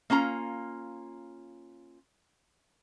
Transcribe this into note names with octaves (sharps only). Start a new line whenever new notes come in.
A#3 C#4 F4 A#5